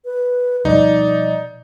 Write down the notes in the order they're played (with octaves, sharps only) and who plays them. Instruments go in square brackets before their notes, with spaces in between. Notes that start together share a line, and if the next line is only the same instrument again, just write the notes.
[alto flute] B4
[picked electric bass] B2 F3 G3 [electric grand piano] D#4 [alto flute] D5